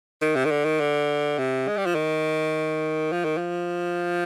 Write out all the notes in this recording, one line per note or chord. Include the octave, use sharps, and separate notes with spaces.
D#3
C3
D#3
D3
D#3
D3
C3
G#3
G3
F3
D#3
F3
D#3
F3